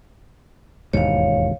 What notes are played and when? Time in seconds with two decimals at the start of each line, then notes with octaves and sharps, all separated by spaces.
0.93 E1 D#2 G#2 C#5 F5